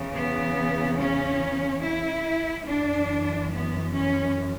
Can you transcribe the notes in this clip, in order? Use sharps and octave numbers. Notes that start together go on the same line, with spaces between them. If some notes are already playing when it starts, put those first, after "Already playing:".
Already playing: E2 C#3 E3
B3
C#4
E4
F#2 E3 D4
B3
C#4